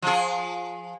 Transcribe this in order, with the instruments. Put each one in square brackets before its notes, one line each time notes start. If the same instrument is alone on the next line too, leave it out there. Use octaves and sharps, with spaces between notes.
[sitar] F3 G#4